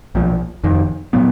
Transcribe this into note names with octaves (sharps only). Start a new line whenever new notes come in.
B1 A#2 F3
F1 F2 D#3
A#2 F#3 B3